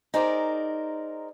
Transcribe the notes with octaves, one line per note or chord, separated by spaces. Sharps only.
D#4 G#4 A#4 C5 D5